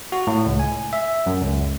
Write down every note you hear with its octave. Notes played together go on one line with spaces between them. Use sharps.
F#4
A2
C#2
G#5
E5
F#2
C#2